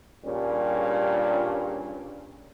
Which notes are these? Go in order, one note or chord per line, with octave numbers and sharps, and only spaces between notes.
G2 A#2 C#3 G3 C#4